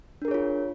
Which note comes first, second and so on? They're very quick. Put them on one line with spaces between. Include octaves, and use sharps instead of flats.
D4 A#4 G#4 C#5 F4